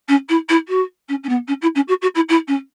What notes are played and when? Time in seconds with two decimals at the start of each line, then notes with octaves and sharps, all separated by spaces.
0.08 C#4
0.29 E4
0.49 E4
0.68 F#4
1.08 C#4
1.23 C#4
1.29 B3
1.47 C#4
1.61 E4
1.75 C#4
1.88 F#4
2.01 F#4
2.15 E4
2.29 E4
2.48 C#4